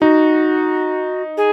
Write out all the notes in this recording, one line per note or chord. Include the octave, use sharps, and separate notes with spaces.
D#4 F#4
G#4